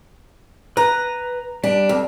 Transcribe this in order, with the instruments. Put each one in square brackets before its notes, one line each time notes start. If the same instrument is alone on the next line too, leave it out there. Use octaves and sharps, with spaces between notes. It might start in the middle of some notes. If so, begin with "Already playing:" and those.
[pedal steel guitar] B4 F#6 [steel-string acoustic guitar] A#5
[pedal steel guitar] G3 [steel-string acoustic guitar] D4
[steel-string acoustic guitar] F2